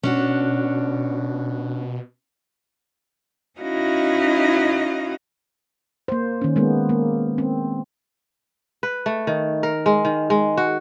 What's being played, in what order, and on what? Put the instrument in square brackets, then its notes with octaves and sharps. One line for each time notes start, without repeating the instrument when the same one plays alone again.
[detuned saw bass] B2 [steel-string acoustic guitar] C#4 D4 F#4
[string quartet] C#4 D#4 E4 F#4 D#5 F5
[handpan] A#3 C5
D#3 C#4
G#3 A#3 B3
A#3
C4
[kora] B4
A3
D#3
A#4
G#3
D#3
G#3
F#4